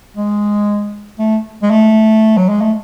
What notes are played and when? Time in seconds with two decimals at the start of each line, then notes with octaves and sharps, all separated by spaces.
0.17 G#3
1.19 A3
1.62 G#3
1.70 A3
2.37 F#3
2.49 G#3
2.61 A3